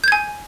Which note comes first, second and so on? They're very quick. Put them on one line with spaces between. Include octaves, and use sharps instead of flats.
G6 G#6 G#5